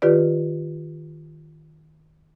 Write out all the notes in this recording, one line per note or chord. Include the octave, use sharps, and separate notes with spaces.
D#3 F4 G4 B4 D5